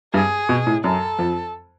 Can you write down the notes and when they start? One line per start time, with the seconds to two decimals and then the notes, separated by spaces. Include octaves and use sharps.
0.14 G2 G#4
0.49 B2
0.67 A2
0.84 F#2 A4
1.19 F2